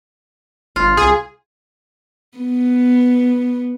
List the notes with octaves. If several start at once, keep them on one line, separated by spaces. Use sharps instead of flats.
G1 F4
C2 G#4
B3